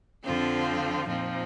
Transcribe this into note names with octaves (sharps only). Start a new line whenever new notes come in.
F2 D3 F3 C4 F4
A#2 F3 C4 D#4